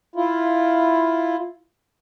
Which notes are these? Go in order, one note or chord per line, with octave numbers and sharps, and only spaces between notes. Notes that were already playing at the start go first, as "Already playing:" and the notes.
E4 F4